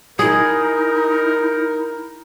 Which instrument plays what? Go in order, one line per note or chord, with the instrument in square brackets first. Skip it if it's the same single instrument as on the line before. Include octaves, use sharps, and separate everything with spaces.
[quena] D#4 [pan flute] E4 [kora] G#4 [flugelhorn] A#4